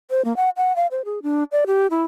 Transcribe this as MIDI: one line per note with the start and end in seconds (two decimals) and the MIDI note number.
0.11 0.24 72
0.25 0.35 58
0.36 0.50 78
0.57 0.75 78
0.76 0.87 77
0.91 1.05 72
1.05 1.22 68
1.23 1.44 62
1.52 1.65 74
1.67 1.87 67
1.91 2.04 64